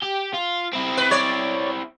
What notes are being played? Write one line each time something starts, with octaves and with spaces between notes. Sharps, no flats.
G4
F4
C4 E4
B4
C#5 D5